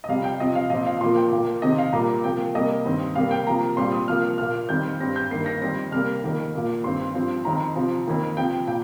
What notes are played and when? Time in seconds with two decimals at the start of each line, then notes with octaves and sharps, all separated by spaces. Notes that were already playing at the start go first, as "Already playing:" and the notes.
0.04 D#5
0.09 F2 C3 G3 F5
0.24 G5
0.40 C3 F3 C4 D#5
0.55 F5
0.70 A#2 F3 C4 D#5
0.86 F5
1.01 A#2 F3 A#3 C6
1.16 G5
1.32 A#2 A#3
1.62 C3 D#3 C4 D#5
1.78 F5
1.93 A#2 G3 A#3 A#5
2.24 C3 F3 A#3 G5
2.55 C3 G3 A#3 D#5
2.85 G2 D#3 C4
3.15 C3 G3 A#3 F5
3.31 G5
3.47 C3 F3 A#3 A#5
3.77 A#2 G3 C4 C6
3.92 D#6
4.08 C3 F3 A#3 F6
4.38 A#2 A#3 F6
4.69 F2 D#3 G3 C4 G6
5.00 G2 G3 C4 A#6
5.16 G6
5.31 G2 D#3 A#3 C7
5.46 A#6
5.61 F2 D#3 G3 C4 A#6
5.92 C3 G3 A#3 F6
6.23 F2 D#3 A#3
6.53 A#2 A#3
6.83 G2 D#3 C4 C6
7.15 G2 F3 C4
7.45 F2 D#3 C4 A#5
7.76 C3 F3 C4
8.07 F2 D#3 A#3
8.37 C3 F3 C4 G5
8.68 A#2 G5